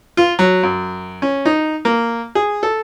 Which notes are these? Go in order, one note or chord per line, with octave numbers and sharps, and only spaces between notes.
F4
F#3
F#2
C#4
D#4
A#3
G#4
A4